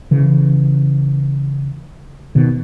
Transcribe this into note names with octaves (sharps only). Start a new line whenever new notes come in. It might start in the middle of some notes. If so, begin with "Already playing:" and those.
C#3 E3
B2 D#3